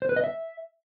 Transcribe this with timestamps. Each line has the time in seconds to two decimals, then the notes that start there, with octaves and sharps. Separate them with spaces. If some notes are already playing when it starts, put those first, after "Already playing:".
0.02 C5
0.09 B4
0.16 D#5
0.24 E5